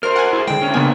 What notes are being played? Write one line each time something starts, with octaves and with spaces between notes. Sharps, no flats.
D2 A#4 C5 F6
F#5 G#5
E4 G#4
D3 G#3 G5
D2 C#4
C#3 A#3 B3 D4 G#5